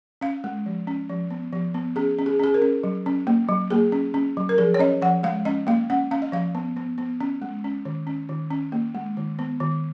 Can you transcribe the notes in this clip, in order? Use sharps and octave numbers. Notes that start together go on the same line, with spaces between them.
C#4 F5
G#3
F3
C#4
F3
B3
F3
B3
C#4 G#4
C#4
G#4
C#4 G#4
A#4
C#4
F#3
C#4
A#3
F#3
A#3 G#4
C#4
C#4
F#3
A#4
F3 G#4
C#5
C#4 D#5
F3 F#5
G#3 F5
C#4 D#5
A#3 F5
C#4 F#5
C#4 F5
D#5
F3 F5
B3
B3
B3
C#4
G#3
C#4
D#3
C#4
D#3
C#4
A#3
G#3
D#3
B3
D#3